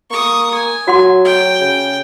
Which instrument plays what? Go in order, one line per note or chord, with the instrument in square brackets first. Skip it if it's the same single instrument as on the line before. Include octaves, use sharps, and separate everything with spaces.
[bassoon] A#3 [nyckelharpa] C#6 D#6
[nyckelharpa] G#5
[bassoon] F#3 [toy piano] F#4 F#5 C6
[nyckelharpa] G5
[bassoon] C#3